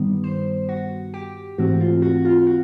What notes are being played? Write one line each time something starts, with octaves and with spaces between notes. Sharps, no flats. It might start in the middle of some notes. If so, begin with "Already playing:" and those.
Already playing: G2 D#3 G3 B3
C5
F#4
G4
G#2 E3 A3 C4 F#4
F4
F#4
F4
F#4